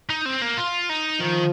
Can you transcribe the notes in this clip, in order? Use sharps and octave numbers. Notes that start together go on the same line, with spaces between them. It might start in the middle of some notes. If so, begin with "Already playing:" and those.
D#4
C4
A#3
F4
D#4
D#3 F3